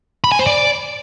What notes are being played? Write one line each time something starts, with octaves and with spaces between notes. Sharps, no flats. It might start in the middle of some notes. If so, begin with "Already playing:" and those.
B5
G#5
C5
D5